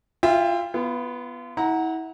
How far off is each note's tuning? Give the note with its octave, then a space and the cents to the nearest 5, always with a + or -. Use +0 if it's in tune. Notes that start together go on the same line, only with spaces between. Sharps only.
F4 -10 E5 +15 G5 +30
B3 +0 F4 -35
E4 -35 F#5 +0 A#5 +0